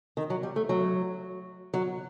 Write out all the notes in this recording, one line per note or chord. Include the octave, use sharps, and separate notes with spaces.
D#3
F#3
G3
A3
F#3
F#3